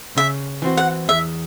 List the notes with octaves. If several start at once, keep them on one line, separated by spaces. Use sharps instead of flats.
C#3 E5
E3 C4 F#4
F#5
E2 E5